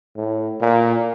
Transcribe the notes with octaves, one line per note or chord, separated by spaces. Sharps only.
A2
A#2